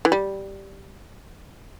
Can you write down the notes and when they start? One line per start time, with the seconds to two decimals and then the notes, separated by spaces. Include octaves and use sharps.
0.05 E3
0.12 G3